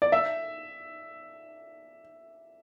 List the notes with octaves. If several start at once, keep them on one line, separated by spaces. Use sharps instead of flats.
D5
E5